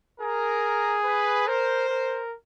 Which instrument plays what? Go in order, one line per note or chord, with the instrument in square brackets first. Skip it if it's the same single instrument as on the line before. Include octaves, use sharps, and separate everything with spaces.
[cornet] G#4 [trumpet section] A#4
[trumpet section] B4
[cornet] A#4 [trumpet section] C5
[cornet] A#4